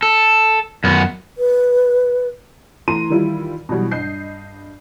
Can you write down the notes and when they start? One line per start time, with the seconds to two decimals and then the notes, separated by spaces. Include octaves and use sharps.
0.03 A4
0.84 F#2 B3
1.38 B4
2.88 E3 A3 A#5 C6 D#7
3.10 D#3 E3 G3 E4 F4
3.69 B2 E3 F#3 G3
3.91 G2 D#5 G6 C7